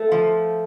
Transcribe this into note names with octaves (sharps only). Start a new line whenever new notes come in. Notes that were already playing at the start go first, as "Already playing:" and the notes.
Already playing: A3
F3